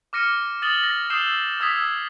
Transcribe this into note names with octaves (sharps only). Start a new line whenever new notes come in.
D6 F6 A#6 C#7 D#7
D#6 A6 D#7 F#7 G7
A#6
D#6 E6 G6 C7 E7 G7
D#6 E6 G#6 B6